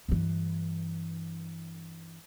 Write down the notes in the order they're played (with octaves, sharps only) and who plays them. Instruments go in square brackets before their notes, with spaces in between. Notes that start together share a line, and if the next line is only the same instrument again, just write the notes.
[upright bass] G2 E3